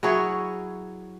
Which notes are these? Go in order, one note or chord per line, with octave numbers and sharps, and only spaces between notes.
F#3 E4 G#4 C#5